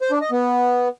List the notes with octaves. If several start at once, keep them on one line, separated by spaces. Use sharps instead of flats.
C5
D4
D#5
B3